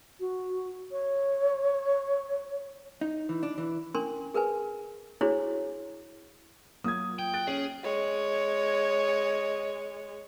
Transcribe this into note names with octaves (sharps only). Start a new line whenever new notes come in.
F#4
C#5
D#4
E3
D4
E3
C#4 D4 A#4 G#5 C6
G#4 A#4 B4 G#5
D4 E4 F#4 G#4 C5 C#5
F#3 A#3 F4 D#6 G#6
G5
F#6 A6 D7
C#4 G#4
G#3 C#5